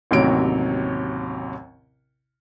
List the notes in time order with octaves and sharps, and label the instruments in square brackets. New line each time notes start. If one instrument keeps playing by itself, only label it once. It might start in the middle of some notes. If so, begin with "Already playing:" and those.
[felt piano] A1 D#2 C3 F#3 C#5 D7